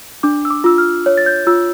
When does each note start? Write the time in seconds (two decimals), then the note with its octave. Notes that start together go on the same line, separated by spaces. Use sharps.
0.23 D4 D6
0.45 E6
0.50 D6
0.64 F4 E6
0.78 F6
1.06 C#5
1.17 A6
1.26 G6
1.47 F4 E6